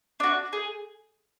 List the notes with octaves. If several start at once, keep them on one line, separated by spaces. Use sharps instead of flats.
D4 F#4
G#4